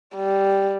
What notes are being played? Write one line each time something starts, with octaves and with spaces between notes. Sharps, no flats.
G3